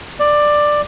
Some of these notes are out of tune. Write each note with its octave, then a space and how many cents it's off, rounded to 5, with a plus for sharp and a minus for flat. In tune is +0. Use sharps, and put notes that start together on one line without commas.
D5 +10